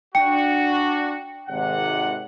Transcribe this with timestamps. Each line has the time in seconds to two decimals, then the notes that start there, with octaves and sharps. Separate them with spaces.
0.15 D4 F#4 G5 C#7
1.48 G#1 C3 F#5